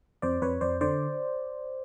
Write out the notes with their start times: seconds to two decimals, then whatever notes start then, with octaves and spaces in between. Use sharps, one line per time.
0.22 F2 C5 D5
0.42 F2 B4 C#5
0.61 F2 C5 D5
0.81 D3 C5 D5